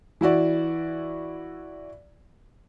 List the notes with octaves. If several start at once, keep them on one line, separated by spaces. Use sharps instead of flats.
E3 E4 F#4 D5